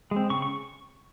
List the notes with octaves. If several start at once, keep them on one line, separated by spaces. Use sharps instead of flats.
G#3 C4
C#3 C#6
C#6